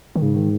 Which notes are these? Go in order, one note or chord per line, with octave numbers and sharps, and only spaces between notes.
D#3
G#2 C#3
D#3